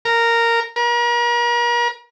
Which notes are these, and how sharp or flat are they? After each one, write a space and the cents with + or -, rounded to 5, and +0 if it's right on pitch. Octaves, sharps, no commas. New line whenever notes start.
A#4 -10
A#4 +40